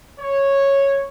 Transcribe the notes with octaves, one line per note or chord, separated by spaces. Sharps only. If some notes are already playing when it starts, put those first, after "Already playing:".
C#5